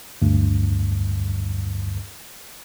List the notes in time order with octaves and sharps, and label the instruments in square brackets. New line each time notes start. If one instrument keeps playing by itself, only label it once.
[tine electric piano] D2 G2